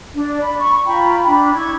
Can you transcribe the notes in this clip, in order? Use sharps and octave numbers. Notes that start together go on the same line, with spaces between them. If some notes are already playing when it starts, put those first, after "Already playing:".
D4
B5
C#6
F4 G5 A#5 B5
D4 B5
E4 C#6 G#6